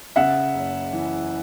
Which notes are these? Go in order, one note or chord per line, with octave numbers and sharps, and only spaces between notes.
C#3 E5 F#5
F#1
E3